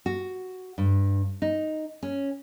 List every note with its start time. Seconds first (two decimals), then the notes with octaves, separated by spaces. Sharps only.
0.06 F#4
0.78 G2
1.42 D#4
2.03 C#4